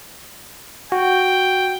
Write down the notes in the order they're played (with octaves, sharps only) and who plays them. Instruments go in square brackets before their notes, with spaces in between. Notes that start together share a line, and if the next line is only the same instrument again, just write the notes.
[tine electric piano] F#4 [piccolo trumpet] G5